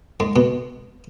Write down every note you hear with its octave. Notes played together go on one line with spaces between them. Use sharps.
G#2
B2